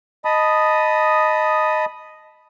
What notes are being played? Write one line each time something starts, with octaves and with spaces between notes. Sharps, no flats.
D#5 A5 B5 D#6